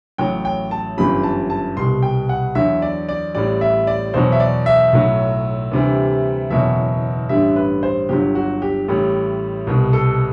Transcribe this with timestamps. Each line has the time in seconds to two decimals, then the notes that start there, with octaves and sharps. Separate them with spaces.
0.18 A1 A2 F#3 G5
0.45 G5
0.71 A5
0.97 G1 F#2 E3 G3 B5
1.23 A5
1.50 A5
1.77 C2 B2 G3 C6
2.03 G5
2.29 F#5
2.55 E2 D3 F#3 E5
2.82 D5
3.09 D5
3.35 A1 A2 G3 D5
3.61 E5
3.87 D5
4.14 E2 B2 F#3 C5
4.32 E5
4.40 D5
4.66 E5
4.93 B1 A2 F#3
5.72 D2 C3 E3 G3
6.50 F#1 E2 B2 F#3 E5
7.29 A1 G2 D3 G3 E5
7.56 B4
7.83 C5
8.09 G1 G2 F#3 G4
8.35 F#4
8.62 G4
8.88 A1 A2 G3
9.67 C2 B2 G3
9.93 A4